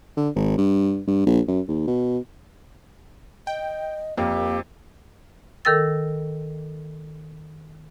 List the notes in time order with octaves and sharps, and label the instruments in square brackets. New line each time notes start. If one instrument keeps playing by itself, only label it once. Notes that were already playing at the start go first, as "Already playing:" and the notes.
[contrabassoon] D3
G#1
G2
G2
A#1
F#2
D#2
B2
[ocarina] D#5 [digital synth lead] G5
[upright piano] F2 [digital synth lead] A#3 [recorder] G4 [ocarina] F5
[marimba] D#3 A4 A#4 G5 E6 A6